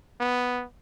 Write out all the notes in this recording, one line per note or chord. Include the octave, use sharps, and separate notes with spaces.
B3